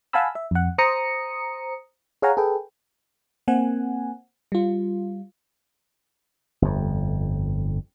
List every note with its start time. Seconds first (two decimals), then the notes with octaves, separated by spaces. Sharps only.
0.13 F5 F#5 G#5 A5 B5 E6
0.35 E5
0.51 F2 F#5
0.78 C5 A#5 D#6 C#7
2.22 G#4 C#5 F5 F#5 G#5 A#5
2.37 G#4 A4 B4 G5
3.48 A#3 C4 F#5 G#5
4.52 G3 F4
6.62 G1 F2